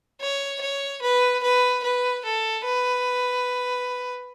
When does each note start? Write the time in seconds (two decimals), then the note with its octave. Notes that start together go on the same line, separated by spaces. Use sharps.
0.21 C#5
0.61 C#5
1.01 B4
1.43 B4
1.84 B4
2.24 A4
2.65 B4